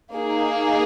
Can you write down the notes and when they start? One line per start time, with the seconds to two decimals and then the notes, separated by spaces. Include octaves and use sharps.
0.15 A#3 D#4 G#4